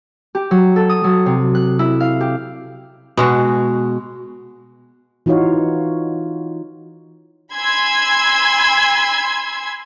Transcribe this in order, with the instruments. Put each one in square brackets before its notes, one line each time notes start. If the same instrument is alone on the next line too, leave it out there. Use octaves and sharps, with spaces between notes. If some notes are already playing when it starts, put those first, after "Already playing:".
[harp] G4
F#3
A4
D#6
F#3
C3
F#6
E4
F5
G4
[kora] B2 G#3 F#4
[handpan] E3 D#4 F4 F#4 C#5 F5
[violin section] G#5 B5 C6 E6 G#6